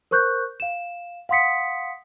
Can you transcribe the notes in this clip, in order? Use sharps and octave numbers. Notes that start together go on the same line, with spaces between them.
A#4 C5 C#6 F#6 G6
F5 E7
F5 F#5 C6 D#6 B6 C#7